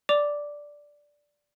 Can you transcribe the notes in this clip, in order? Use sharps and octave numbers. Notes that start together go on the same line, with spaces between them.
D5 D6 F7